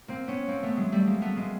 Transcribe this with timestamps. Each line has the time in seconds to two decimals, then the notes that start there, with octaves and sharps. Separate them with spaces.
0.08 A#3 C4
0.28 B3 C#4
0.48 A#3 C4
0.63 A3 B3
0.77 F#3 G#3
0.92 G3 A3
1.07 G#3 A#3
1.22 A3 B3
1.36 G#3 A#3